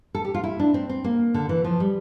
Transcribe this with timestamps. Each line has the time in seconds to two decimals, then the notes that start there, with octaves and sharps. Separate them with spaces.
0.15 A4
0.25 G4
0.34 F4
0.44 E4
0.60 D4
0.74 C4
0.89 C4
1.04 A#3
1.34 D3
1.49 E3
1.64 F3
1.80 G3